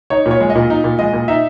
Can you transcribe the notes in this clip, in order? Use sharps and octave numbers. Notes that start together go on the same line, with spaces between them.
D#4 C#5
A#2
C#5
G#3
D#5
A#2
D#4
A#2
G#3 D#5
A#2
D#4 E5